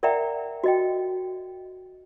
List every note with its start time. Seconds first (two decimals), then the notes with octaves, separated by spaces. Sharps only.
0.03 A#4 D5 E5 F#5 G5 A#5
0.64 F#4 D#5 G5